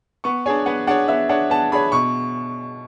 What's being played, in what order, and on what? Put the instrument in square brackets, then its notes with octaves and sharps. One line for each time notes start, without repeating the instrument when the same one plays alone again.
[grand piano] B3 [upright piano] C#6
[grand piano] D4 G#4 C#5 [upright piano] G#5
[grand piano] B3 [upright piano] F#5
[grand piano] D4 G#4 C#5 [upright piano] F#5
[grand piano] B3 [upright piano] E5
[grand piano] D4 G#4 C#5 [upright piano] F#5
[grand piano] B3 [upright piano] A5
[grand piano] D4 G#4 C#5 [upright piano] B5
[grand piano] B2 [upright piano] C#6